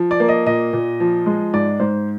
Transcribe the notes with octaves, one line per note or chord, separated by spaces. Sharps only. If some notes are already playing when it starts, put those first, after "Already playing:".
Already playing: F3
D5
A#3
D#5
A#2 D#5
A#2
F3
G#3
G#2 D5
G#2 C5